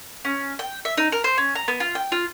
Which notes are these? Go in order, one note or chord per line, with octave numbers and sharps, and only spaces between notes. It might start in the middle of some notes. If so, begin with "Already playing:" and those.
C#4
G5
E5
D#4
A#4
C5
C#4
A#5
B3
F4
G5
F4